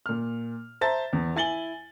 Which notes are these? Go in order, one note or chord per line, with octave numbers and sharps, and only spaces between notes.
A#2 F6
C5 E5 A5 A#5 A6
E2
E4 G#5 A6 F#7 G7